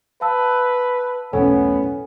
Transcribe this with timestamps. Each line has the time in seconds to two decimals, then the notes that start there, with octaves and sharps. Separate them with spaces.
0.21 B4 F5 A5 E6
1.33 E1 B1 A2 B3 C#4 A4 G#5